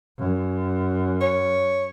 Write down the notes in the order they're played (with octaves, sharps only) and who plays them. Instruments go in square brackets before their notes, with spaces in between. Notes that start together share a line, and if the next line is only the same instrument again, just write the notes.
[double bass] F#2
[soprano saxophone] C#5